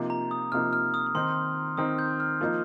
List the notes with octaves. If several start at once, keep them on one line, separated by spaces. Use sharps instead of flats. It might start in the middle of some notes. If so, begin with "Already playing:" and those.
Already playing: C3 F3 A#3 D#4
A#5
D#6
C3 F3 A#3 D#4 F6
F6
D#6
D#6
D#3 C4 D#4 C6
D#3 C4 D#4 D#6
G6
F6
F3 A#3 D#4